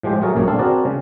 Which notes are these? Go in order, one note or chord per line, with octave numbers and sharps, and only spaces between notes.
A2 F3 G#3 G4 C5
F#3 A3 G#4 A#4 C#5 A5
A#1 F#2 A#2 A#3 C#5
C4 D4 A4 F5
C4 D4 F#4 G#4 A#4 D5
C#3